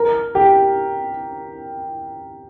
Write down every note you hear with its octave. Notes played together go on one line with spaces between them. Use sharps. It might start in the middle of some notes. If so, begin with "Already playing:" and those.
Already playing: A#4
G4